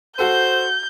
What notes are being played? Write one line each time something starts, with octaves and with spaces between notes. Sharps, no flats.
F#4 A4 C5 G6